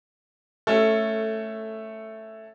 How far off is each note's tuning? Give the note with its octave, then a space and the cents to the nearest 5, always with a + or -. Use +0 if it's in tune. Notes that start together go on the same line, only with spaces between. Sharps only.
A3 +0 C#4 +0 A4 +10